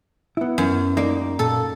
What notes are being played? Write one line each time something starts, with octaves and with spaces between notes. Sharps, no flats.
B3 E4
F#2
A#3 D#4 D5
A#2 A4